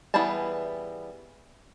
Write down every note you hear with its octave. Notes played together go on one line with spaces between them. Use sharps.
E3 G3 B3 G#4 A5